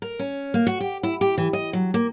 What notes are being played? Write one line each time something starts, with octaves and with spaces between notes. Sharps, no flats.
A#4
C#4
A#3
F#4
G4
E4
G4
E3
D#5
F#3
A#3